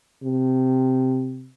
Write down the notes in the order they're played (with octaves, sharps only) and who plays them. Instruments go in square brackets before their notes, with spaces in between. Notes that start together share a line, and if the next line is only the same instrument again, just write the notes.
[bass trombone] C3